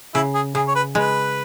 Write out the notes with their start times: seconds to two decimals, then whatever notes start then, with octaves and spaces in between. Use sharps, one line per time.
0.14 C#3 E4
0.34 G#4
0.55 C#3 G#4
0.67 C#5
0.75 B4
0.95 G#3 B4